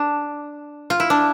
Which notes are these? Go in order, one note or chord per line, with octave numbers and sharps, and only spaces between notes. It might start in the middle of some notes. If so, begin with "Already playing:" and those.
Already playing: D4
F4
E4
D4